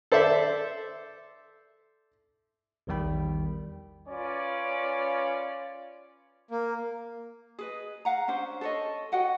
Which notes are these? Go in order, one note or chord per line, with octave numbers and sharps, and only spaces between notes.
A4 C5 D5 E5
A#1 E2 D#3 G3 G5 B5
C#4 F4 B4 D5
A#3
G#4 B4 D#5
F5 F#5 A#5
C#4 D4 C5
A4 C#5 D#5
F#4 D#5 F#5 G5